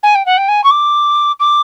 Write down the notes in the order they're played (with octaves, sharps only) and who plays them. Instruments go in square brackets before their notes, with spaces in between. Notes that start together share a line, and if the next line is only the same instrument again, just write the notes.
[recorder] G#5
G5
F#5
G5
G#5
C#6
D6
D6